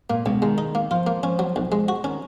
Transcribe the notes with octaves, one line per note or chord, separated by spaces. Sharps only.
A#2 A#3
C#2 B2
D#3 G#3
D#4
A#3
F3 F4
A#3
F3 C#4
F#3
B1
G#3
F#4
D#3 C#4